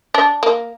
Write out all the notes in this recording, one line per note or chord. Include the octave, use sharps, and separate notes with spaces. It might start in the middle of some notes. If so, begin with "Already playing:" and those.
D4
A#3